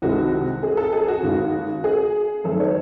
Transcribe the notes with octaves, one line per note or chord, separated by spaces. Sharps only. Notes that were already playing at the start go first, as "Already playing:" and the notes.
C2 C3 D#3 G#3 F#4
G#4
A4
G#4
F#4
D#2 C#3 G#3
G#4
F#2 D#3 A3 A4
C#5